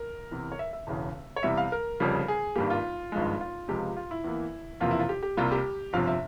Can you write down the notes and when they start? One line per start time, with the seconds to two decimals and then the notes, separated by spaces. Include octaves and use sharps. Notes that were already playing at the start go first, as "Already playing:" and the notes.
Already playing: A#4
0.31 E2 C3 E3
0.52 C#5
0.59 E5
0.73 E5
0.87 E1 E2 C#3
1.36 C#5
1.43 E2 C3 G3 E5
1.57 F5
1.72 A#4
2.00 F1 F2 C#3 G3
2.28 G#4
2.56 G#1 G2 G3 A#3 G4
2.70 F4
3.12 G#1 G2 F3 G#3
3.41 F4
3.68 C#2 C3 F3 G#3 G4
3.97 F4
4.11 E4
4.24 E2 E3 A#3
4.80 E1 E2 C3 F3 A#3 F4
4.91 E4
4.99 F4
5.09 G4
5.23 G4
5.37 C2 C3 G3 A#3 F4
5.52 G4
5.93 G1 F2 C3 F3 F5
6.07 E5